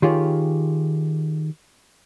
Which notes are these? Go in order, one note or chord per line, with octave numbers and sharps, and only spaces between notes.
D#3 F4 G4 G#4 C#5